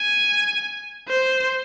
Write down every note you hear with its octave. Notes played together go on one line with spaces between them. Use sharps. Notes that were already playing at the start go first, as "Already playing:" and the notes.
Already playing: G#5
C5